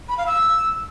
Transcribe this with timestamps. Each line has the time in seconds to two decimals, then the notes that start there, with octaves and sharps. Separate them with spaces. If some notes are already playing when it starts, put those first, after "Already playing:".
0.09 B5
0.18 F5
0.27 E6